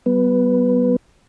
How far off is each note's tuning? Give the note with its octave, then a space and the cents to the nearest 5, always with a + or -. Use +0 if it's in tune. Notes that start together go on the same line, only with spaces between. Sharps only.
G3 -45 B3 +0 B4 +0